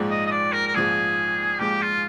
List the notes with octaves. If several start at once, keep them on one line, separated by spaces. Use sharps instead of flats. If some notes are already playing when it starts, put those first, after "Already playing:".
Already playing: A#1 G#2 F3 G#3
D#5
D#5
D5
A#4
A#4
A#1 G#2 F3 G#3 G#4
A#1 G#2 F3 G#3 G4
F4